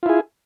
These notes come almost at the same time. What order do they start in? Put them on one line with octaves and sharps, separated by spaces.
F4 E4 G#4